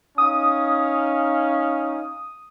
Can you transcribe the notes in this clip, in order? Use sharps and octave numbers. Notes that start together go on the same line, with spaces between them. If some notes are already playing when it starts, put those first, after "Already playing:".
C#4 D#4 F5 D#6